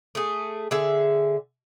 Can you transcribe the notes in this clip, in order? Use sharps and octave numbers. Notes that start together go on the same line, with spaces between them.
A3 G#4
D3 G#4 E5